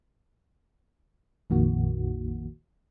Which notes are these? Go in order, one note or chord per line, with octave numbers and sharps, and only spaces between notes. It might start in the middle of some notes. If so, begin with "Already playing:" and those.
A#1 F2 A#2 D#3 A#3 F#4